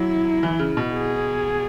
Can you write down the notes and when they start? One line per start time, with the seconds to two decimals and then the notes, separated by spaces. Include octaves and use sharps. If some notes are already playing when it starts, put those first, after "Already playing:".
Already playing: F#3 E4
0.43 E3
0.59 C#3
0.77 B2
0.94 G#4